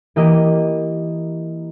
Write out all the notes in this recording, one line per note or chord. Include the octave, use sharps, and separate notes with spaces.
E3 A#3 G4 D#5